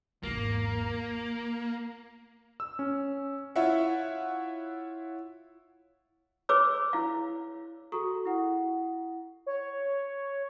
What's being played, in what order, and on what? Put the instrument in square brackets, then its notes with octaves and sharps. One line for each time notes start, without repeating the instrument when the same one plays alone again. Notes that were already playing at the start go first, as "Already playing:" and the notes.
[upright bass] G#1 E2 [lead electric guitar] A#3
[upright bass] F4
[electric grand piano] E6
C#4
[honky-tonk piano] E4 F4 C#5 E5 F#5
[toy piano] G#4 B4 C#5 D6 E6
E4 F5
[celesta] F#4 G#4 A4 A#5 C#6 D#6
E4 F#5
[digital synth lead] C#5